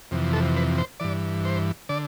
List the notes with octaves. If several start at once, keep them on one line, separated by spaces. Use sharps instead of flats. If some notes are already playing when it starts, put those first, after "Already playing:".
F2 C3 E3
A4
B4
C5
G2 E3 D5
C5
D3 D5